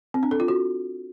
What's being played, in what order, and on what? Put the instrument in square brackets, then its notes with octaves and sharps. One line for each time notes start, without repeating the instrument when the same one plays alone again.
[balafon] C4
D4
A4
F4
F#4